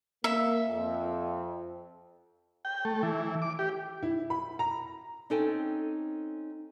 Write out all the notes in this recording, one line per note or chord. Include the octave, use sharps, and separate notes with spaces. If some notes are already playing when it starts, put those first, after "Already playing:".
A#3 E5
F2
G5
A3
E3
D6
G4
E4
B5
A#5
C4 C#4 D#4 A4 G5 G#5